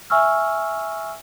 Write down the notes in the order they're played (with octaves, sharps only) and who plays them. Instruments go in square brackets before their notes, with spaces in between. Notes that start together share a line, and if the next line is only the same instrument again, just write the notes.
[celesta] E5 G#5 C#6 E6 F6